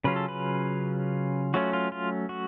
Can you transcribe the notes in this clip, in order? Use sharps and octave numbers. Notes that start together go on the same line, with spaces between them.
C#3 F#3 C#4 F4 B4
A4
B4
F#3 A3 C#4 F4 F#4
F4
F4
F#4